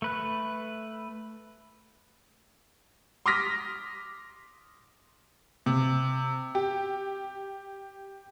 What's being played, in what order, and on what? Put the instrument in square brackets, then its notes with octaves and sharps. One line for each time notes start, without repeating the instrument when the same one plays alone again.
[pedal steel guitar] A3 B4 F#6
[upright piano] C6 D6 D#6 F6 A#6 B6
[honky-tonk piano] C3
G4